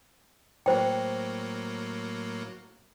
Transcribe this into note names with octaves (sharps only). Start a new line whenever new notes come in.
A2 F#3 A#3 C5 G5